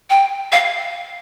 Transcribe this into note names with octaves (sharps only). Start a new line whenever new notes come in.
G5
F5